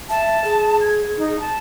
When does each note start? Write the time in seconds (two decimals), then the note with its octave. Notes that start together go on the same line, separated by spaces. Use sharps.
0.10 E5 A5
0.44 G#4
0.81 G#6
1.17 D#4
1.40 A5